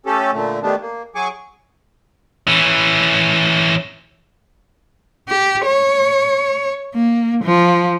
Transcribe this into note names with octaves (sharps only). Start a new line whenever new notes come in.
A3 C#4 G4 A4
A#2 D3 A3
D#3 G3 A3 B3 D4
A#3
F#3 G#4 G#5 C#6 D6
E3 C#4
G4
C#5
A#3
F3